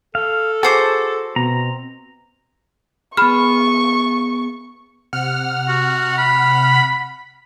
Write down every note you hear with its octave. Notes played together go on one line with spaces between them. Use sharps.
A4 F5
F#4 G#4 C5 A5 D6
B2 C4 A#5
B3 G#4 B5 C#6 F6
C3 F#5 F6
F#4
B5